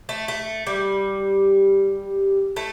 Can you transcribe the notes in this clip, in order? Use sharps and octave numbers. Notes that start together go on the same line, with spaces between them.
A3
A3
G3
A3